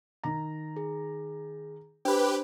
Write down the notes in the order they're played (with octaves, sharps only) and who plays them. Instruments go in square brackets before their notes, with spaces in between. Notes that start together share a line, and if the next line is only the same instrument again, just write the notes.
[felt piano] D#3 A#5
[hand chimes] G#4
[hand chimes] D4 C5 [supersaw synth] G4 B4